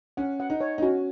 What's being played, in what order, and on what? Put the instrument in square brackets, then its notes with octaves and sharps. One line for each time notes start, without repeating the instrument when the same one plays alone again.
[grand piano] C#4 [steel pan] F#5
[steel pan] F#5
[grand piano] D#4
[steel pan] C#5
[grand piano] D#4
[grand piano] C#4 [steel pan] F#4